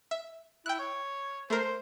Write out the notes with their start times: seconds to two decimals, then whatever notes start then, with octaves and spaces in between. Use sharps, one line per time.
0.11 E5
0.66 E4 G5 F#6
0.79 C#5
1.50 A3 A#4 C5